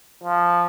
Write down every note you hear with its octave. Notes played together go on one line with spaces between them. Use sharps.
F3